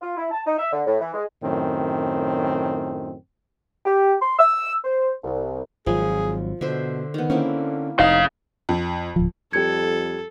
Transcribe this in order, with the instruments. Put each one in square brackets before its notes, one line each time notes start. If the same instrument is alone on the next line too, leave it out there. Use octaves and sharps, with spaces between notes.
[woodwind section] F4
E4
A5
D#4
E5
D3
A2
E3
G#3
[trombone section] F#2 A2 D#3 C4
[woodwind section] G4
C6
E6
C5
C2
[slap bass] G#1 F#3 [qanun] F3 [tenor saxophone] G#4
[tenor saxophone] B2 [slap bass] D3 [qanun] C5 E5
[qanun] D#3 B3
[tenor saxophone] D3 [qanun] A#3 C4 E4 [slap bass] C#4
[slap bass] F1 [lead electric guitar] C#3 F5 [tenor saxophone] D#4
[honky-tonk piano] F2
[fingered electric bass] D1 F3
[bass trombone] F2 [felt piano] G3 C#7 [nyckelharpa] A4 [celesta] G#6